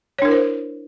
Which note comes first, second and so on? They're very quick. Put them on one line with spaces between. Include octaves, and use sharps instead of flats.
C#5 D4 A#4 E4 C5